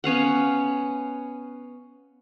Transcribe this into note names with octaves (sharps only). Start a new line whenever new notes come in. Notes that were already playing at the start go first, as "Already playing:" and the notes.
B3 C#4 F5 F#5